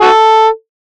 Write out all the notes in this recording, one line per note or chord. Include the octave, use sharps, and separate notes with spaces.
F#4 A4